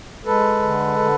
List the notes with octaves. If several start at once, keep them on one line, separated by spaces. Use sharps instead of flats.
G#3 A4 B4
D3
D3